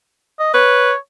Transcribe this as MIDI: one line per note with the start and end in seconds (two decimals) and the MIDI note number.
0.40 0.53 75
0.54 0.91 71
0.54 0.96 73